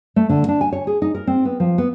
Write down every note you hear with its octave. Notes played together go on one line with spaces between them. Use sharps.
A3
D3
D4
G#5
C#5
G#4
D#4
A#4
C4
B3
F3
B3